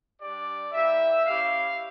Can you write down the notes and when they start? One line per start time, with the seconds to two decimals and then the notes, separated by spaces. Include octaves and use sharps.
0.20 G3 D4 G4 D5
0.72 A#3 E4 G4 E5
1.25 C#4 E4 G4 F5